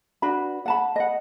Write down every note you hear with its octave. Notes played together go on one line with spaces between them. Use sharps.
D4 F#4 B4 B5
F#5 A5 B5
D#5 F#5